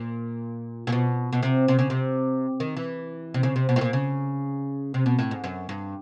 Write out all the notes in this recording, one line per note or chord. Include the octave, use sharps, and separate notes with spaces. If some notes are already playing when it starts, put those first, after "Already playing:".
Already playing: A#2
A#2
B2
B2
C3
C3
C#3
C3
D#3
E3
C3
C#3
C3
B2
A2
A#2
C#3
C3
B2
A2
G#2
F#2
G2